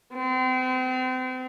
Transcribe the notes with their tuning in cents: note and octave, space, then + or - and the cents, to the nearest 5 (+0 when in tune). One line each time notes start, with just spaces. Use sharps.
C4 -35